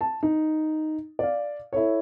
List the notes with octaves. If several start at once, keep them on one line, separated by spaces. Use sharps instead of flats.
A5
D#4
D5 F5
E4 A4 C#5